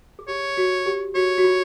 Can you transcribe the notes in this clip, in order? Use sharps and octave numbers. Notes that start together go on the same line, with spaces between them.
G#4
G4 C#5
F#4
G4
F#4 C#5
F#4
F4